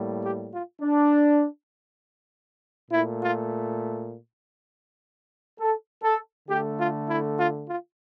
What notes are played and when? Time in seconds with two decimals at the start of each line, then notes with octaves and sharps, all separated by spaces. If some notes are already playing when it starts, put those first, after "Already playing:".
Already playing: A2 G3 A#3
0.23 G4
0.53 F4
0.82 D4
2.91 A#2 A3 E4
3.21 F4
5.60 A4
6.03 A4
6.49 D3 A3 G4
6.78 F4
7.08 E4
7.38 F4
7.67 F4